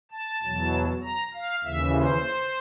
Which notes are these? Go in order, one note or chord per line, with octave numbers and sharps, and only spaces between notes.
A5
E2 B2 F#3
A#5
F5
D#2 C#3 E3 E5
C5